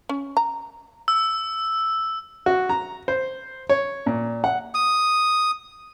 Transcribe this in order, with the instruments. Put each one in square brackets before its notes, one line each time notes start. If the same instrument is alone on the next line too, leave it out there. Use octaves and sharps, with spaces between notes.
[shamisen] C#4
A#5
[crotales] E6
[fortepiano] F#4
A#5
C5
C#5
A#2
F#5
[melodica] D#6